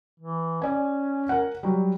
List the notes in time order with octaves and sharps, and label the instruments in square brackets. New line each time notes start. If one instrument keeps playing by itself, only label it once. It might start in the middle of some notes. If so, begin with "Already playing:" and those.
[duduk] E3
[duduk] C#4 [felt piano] D5 G#5
[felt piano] A#4 F#5
F#3 G3